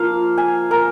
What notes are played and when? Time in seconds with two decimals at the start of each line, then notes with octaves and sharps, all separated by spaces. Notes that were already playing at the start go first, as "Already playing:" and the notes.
Already playing: F3 A#3 F5
0.38 G#5
0.71 A#4